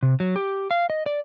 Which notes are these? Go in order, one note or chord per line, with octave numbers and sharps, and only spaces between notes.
C3
F#3
G4
F5
D#5
D5